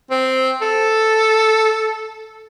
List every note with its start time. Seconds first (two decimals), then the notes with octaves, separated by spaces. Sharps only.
0.10 C4
0.61 A4